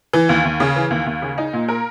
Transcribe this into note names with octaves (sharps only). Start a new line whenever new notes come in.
E3
D#2
D#2
C#3
E3
D#2
D#2
C#3
D#4
A#2
A#4